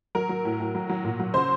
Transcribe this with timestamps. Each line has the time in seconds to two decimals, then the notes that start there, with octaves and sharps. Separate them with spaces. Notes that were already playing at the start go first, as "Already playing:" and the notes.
0.15 F#3 A#4
0.29 F#3
0.45 A2
0.60 A2
0.75 F#3
0.89 F#3
1.05 A#2
1.20 F#3
1.34 C#3 C5